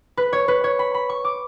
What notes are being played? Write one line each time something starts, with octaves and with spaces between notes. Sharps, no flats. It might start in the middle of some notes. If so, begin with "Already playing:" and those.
B4
C#5
B4
C#5
B5
B5
C#6
D6